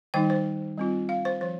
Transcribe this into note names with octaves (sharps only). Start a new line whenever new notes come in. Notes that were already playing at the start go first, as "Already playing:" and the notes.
D#3 G3 D#4 G5
C5
G3 C4 F4
F5
C5
F3 C5